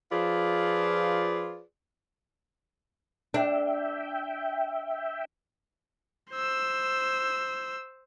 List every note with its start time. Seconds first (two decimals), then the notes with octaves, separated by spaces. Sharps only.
0.12 F3 F4 G#4 B4 C5 D5
3.34 D4 E5 G5
6.32 C5 E6